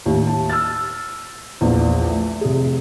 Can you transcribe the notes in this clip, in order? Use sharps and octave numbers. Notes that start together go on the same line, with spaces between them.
D#2 A2
A5
E6 F6 A6
A#1 E2
A3
F1 G#4